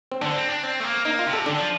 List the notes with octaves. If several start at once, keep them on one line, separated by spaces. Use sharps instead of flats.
C4
D3 D4
C4
D4
C4
A3
A#3
A#3 D#4
F4
C3
A4
D3 D4
F3